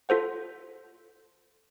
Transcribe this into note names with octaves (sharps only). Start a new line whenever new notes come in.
F4 A4 C5 F#5